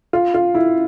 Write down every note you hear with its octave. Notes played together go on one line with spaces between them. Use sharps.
F4
F4
E4